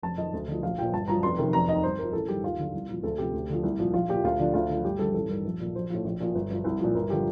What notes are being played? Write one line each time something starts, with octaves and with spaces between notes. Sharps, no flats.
F1 A5
F2 D#3 D#5
D2
D3 F3
A#1 F5
A#2 F3 G5
G1 A5
G2 F3 A#5
F1 C6
F2 C3 D#3
F1 A#5
D#2 D#3 D#5
G1 C5
G2 F3 A#4
A1 A4
G2 D#3 G4
D#2 F4
D3 F3
C2
A#2 F3
D2 A4
C3 F3 G4
D2
D3 F3
C2
A#2 F3
A#1 F4
A#2 F3 G4
D2 F4
D3 F3 D4
D2 F4
D3
F3
G1 G4
G2 D3 F3 A4
A1 A4
G2 D#3
A#1
A#2 F3
A#1 C5
A2 F3
A#1
A#2 F3
G1
G2 F3
C2
A#2 F3
G1 A#4
D3 F3 G4